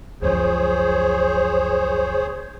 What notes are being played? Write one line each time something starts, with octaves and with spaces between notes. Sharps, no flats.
C#2 F#2 F3 G#4 C5 C#5